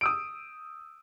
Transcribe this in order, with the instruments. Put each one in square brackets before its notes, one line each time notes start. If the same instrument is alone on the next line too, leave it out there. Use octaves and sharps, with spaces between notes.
[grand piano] D#6 E6 D7